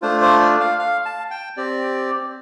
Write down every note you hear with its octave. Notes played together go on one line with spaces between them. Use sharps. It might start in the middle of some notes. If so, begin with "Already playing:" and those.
A3 D4 F4 C5
C5
D5
F5
F5
A5
G5
C4 G4 D5